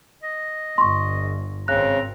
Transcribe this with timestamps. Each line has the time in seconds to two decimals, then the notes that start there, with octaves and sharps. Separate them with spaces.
0.23 D#5
0.78 G1 C6 C#6
1.68 G#1 C#3 C4 A#5 F#6